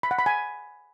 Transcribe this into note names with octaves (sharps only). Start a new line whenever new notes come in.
B5
F#5
B5
G#5